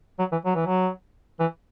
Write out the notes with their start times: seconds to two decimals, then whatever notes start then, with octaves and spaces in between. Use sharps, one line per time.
0.19 F#3
0.32 E3
0.45 F#3
0.55 E3
0.66 F#3
1.40 E3